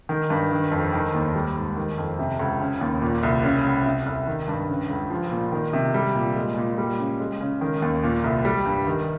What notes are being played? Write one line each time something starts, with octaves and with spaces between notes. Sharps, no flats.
D#3
G2
D#3
F2
D#3
D#2
G3
G#2
D#3
F2
C3
C#2
C#3
D#2
A#2
C2
C#3
C#2
C3
C2
D#3
G2
C#3
C#2
F3
A#2
D#3
C3
G3
A#2
G#3
A#2
G3
C#3
G#3
C#3
D#3
D#2
A#2
C2
G3
G2
D#3